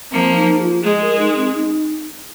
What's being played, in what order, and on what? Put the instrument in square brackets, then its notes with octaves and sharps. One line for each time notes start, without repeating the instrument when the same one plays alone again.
[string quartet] F3 A#3 [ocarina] C4
[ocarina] D#4
G#4
F4
[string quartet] G#3 [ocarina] G#4
[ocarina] A#4
D#4
C4
D#4